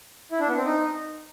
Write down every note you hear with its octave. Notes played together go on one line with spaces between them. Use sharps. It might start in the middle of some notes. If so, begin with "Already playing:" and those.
E4
D4
B3
C4
D#4